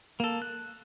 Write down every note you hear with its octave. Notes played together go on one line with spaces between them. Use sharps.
A#3 A4
F#6